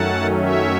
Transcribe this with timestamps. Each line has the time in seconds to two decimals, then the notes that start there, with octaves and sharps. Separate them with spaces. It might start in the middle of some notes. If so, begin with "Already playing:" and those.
Already playing: F#2 D#3 F#3 A3 C#4 F#5 A5
0.42 C#5 E5